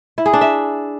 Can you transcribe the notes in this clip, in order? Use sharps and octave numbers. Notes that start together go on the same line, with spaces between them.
E4
G#4
D4
E5